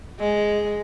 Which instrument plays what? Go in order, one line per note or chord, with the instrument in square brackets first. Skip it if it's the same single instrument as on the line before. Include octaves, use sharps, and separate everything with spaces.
[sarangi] G#3